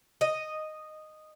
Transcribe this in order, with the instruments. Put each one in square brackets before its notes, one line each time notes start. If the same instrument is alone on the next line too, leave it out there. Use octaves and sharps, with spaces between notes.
[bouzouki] D#5